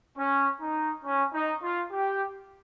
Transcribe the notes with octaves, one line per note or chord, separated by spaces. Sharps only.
C#4
D#4
C#4
D#4
F4
G4